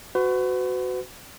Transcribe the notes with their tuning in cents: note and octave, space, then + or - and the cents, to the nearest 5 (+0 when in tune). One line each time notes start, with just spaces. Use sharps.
F#4 +0 B4 +40